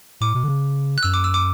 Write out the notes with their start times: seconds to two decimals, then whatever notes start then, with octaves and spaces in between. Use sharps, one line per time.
0.21 A2 D6
0.35 B2
0.44 D3
0.48 C#3
0.98 F#6
1.03 F#2 E6
1.14 D6
1.24 E6
1.34 D6